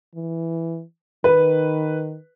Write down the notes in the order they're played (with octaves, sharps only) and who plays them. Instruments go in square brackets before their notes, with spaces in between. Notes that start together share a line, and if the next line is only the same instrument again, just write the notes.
[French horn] E3
[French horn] D#3 [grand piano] B4